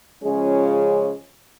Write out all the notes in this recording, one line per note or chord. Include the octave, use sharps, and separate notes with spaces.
C#3 F3 G#3 C#4 F4 G#4